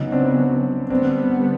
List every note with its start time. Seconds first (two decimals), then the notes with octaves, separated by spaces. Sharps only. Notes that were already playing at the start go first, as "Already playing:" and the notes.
Already playing: C#3 F#3 B3 C#4 D#4
0.12 C4 D4
0.90 D3 G3 B3 C4 D4